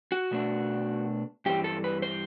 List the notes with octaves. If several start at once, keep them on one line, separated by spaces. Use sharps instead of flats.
F#4
B2 A3 D4
G2 E3 G3 C4 G4
A4
B4
C5